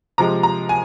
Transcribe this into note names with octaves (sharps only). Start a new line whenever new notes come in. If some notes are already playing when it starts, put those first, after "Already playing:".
C3 F3 G#3 A#5
A#5
G#5